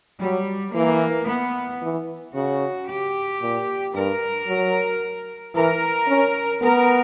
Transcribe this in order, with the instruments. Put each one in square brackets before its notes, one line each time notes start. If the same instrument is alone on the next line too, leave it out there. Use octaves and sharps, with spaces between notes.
[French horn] F#3 [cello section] G3
[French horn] E3 [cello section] A#3
[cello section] B3
[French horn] E3
[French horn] C#3 [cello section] F#4
[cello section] G4
[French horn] A#2
[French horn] G2 [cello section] A#4
[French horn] F#3
[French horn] E3 [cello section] A#4
[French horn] C#4
[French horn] B3 [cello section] A#4